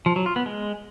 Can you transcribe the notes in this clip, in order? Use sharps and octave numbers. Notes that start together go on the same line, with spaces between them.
F3
F#3
F4
B3
G#3